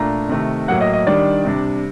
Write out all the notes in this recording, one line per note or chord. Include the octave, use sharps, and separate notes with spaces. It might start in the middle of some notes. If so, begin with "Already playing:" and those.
Already playing: A#2 A3 D4 A#5
C3 D#3 A3
A2 F#3 A#3 F#5
D#5
D#5
D#3 G3 D4 D5
C3 G3 D4